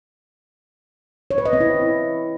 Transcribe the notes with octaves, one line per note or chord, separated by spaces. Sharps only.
C#5
B4
D#5
C4
E4